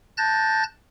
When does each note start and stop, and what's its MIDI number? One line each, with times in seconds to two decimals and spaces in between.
0.18 0.63 81
0.18 0.63 90
0.18 0.63 91
0.18 0.63 93
0.18 0.63 94